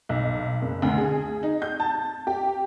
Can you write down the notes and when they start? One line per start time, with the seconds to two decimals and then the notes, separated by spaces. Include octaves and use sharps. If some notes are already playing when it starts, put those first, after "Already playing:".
0.09 B1
0.62 F#1
0.82 D2
0.98 G#4
1.43 D#4
1.62 G6
1.80 A5
2.27 G4